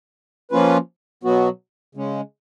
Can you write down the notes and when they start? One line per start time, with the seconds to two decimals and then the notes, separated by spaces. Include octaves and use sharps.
0.51 F3 A#3 C#4 F4 B4
1.23 B2 F#3 B3 F#4
1.95 C#3 G#3 C#4